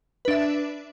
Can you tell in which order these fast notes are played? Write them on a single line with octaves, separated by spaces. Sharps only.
B4 D4 E5